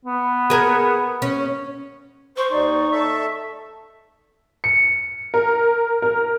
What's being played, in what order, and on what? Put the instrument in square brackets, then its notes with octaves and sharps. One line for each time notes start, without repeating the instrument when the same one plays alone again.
[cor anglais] B3
[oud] G#4 A#4
C#4
[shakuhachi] C5 [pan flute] C#6
[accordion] D#2 [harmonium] D#4 [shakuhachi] D5
[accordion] A4 E5
[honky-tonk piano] C#7
A#4
A#4